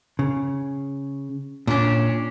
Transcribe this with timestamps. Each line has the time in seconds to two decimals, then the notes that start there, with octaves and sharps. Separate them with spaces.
0.19 C#3
1.67 A#2 C#4 D4